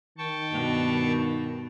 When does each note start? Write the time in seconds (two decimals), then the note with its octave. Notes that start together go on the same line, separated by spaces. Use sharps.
0.18 D#3 G5 A5 C#6
0.51 G2 B2